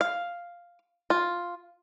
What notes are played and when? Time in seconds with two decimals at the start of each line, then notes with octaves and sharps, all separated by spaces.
0.01 F5
1.10 F4